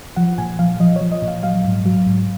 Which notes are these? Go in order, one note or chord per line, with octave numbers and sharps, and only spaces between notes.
F3 F#5
A#2 G#5
F3 F5
F3 D#5
C#5
F3
D#5
A#2
F5
F#3 F5
G#2
F#3
G#2